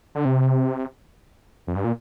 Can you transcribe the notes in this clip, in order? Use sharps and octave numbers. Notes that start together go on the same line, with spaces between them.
D3
C3
F2
G2
A#2